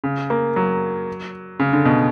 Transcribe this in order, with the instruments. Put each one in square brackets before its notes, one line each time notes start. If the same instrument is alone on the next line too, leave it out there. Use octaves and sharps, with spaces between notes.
[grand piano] C#3
A#3
F#3
C#3
D3
B2